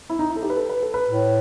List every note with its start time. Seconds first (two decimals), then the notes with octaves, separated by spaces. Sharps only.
0.10 E4
0.19 D#4
0.30 E4
0.36 A4
0.43 G4
0.50 B4
0.57 A4
0.69 B4
0.83 A4
0.94 B4
1.09 A2